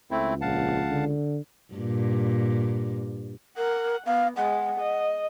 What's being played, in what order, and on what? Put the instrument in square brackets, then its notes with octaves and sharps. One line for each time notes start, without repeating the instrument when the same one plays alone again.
[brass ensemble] C#2 [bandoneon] A3 C4 E4
[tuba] A#1 [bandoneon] F5 F#5 A5
[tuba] D3
[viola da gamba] G2 A#2
[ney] A#4 [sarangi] F#5
[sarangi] B3 [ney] F5
[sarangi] G#3 [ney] F#5
[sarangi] D#5